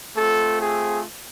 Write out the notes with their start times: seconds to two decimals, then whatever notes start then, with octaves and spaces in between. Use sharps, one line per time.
0.16 A3 C4 F4 A4
0.60 G#4